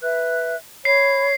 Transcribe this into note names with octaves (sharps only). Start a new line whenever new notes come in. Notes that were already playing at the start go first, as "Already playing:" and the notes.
B4 E5 F#6
C#5 B5 C7